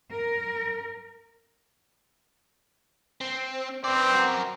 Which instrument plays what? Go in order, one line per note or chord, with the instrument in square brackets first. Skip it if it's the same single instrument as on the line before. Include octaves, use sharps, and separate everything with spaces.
[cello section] A#4
[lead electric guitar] C4
[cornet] C4 [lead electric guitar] B4 D5
[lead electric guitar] F#4 A#4